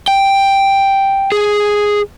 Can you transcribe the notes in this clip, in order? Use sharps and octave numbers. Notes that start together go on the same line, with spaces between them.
G5
G#4